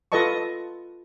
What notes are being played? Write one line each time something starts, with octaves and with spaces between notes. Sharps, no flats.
F4 A4 B4 D#5 A5 C#6